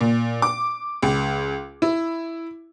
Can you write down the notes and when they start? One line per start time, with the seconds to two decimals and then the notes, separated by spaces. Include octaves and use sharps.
0.01 A#2
0.42 D6
1.02 C#2
1.82 E4